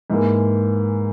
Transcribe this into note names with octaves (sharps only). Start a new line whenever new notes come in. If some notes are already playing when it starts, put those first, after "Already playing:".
G#2 E3 A#3